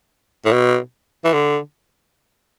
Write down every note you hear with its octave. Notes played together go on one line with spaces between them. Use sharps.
A2
B2
E3
D3